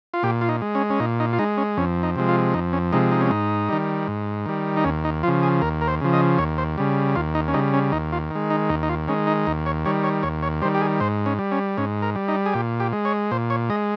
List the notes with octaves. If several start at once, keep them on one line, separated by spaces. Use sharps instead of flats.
F4
A#2 G4
F4
D#4
G#3
C#4
C#4
A#2 D#4
D#4
F4
G#3 D#4
C#4
F2 C#4
D#4
C3 F3 G#3
F4
F2 D#4
C#4
C3 F3 G#3 D#4
D#4
C#4
G#2 D#4
D#3 G3
G#2
D#3 G3
D#4
D#2 C#4
D#4
C#3 F3 F4
G#4
D#2 A#4
A#4
C5
C#3 F3
D#5
D#2 C#5
C5
C#3 G3
D#2 F4
D#4
C#4
C#3 G3 D#4
C#4
D#2 D#4
F4
D#3 G#3
D#4
D#2 D#4
D#4
F4
D#3 G#3 C#4
D#4
D#2 D#4
C#5
D#3 G3 C#5
C#5
D#2 C#5
C#5
D#3 G3 C5
G4
G#4
G#2 C5
C#4
G3
C#4
G#2 C#4
A#4
G3
D#4
G#4
A#2 G4
G4
G#3
C#5
A#2 C5
C#5
G#3 D#5